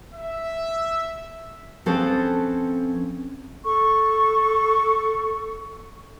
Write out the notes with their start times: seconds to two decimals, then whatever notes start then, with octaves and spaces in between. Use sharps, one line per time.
0.14 E5
1.86 F3 C4 C#4 A4 B4 C5
3.65 A4 C#6